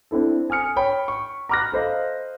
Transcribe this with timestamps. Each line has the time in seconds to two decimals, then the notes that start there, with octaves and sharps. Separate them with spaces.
0.11 C4 D4 E4 A4
0.50 G#5 D#6 F6 C#7
0.76 C#5 G5 B5
1.08 C#6
1.49 A#5 B5 D6 F6 F#6 A#6
1.72 A4 C5 D#5 F5